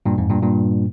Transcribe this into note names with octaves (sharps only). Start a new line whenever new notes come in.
G2 A#2
F2 G#2
G2 A#2
G2 A#2